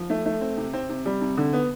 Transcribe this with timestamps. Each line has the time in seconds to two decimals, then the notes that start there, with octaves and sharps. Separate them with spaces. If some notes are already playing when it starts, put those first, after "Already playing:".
Already playing: F3
0.10 A3
0.26 A3
0.41 C4
0.57 C3
0.73 C4
0.89 C3
1.05 G3
1.21 C3
1.37 D3
1.53 B3